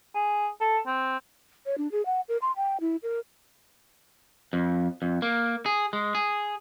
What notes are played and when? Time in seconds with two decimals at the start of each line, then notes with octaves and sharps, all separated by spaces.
0.15 G#4
0.61 A4
0.86 C4
1.66 C#5
1.78 D4
1.92 G#4
2.06 F#5
2.29 A#4
2.42 C6
2.56 G5
2.80 E4
3.03 A#4
4.53 F2
5.02 F2
5.22 A#3
5.66 G#4
5.93 G#3
6.15 G#4